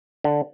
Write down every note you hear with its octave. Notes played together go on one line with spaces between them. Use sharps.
D3